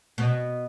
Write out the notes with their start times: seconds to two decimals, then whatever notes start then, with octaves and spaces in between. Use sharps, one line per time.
0.18 B2